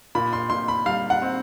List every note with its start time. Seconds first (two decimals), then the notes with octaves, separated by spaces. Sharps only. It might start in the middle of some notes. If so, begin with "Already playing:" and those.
0.15 A#2 B5
0.33 C6
0.50 A#2 C6
0.68 B5
0.86 G3 F5
1.10 F#5
1.22 C4